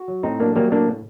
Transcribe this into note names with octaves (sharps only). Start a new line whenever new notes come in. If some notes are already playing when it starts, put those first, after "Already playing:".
Already playing: F#4
F#3
A2 C4 D#4
F#3 A#3 D4
F#3 G3 A#3
A2 A#3 D4